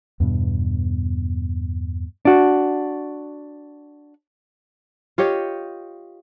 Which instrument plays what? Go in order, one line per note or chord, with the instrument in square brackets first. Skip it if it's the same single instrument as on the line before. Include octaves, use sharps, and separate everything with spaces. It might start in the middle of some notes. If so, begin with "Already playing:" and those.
[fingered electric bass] E2 G2 B2
[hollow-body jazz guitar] D4 F#4
[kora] F4 G4 C#5 D#5